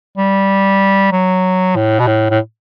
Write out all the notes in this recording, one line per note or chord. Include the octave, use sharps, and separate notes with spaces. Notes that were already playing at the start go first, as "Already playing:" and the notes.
G3
F#3
A2
B2
A2
A2